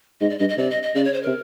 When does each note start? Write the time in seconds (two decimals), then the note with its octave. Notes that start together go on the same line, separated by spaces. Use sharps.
0.21 G#2 D#5
0.30 D5
0.39 G2 D#5
0.49 D#5
0.58 C3 D5
0.70 D#5
0.83 D#5
0.95 C#3 D5
1.05 C#5
1.14 C5
1.23 C3 A#4